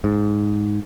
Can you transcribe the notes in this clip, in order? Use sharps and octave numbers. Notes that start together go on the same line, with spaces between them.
G#2